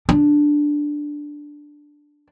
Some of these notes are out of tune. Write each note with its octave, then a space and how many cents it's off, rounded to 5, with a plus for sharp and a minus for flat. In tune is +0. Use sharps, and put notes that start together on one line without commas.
D4 +0